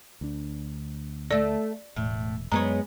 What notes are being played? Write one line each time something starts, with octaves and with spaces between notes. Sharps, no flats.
D2 D4
A3 A4 D5
E1 A2
F#2 F#3 G#3 B3 C#5 A#5